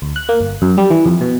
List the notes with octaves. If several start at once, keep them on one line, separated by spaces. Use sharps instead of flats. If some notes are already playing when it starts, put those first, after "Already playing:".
D2
F#6
A#3
G1
F#2
G3
E3
F2
B2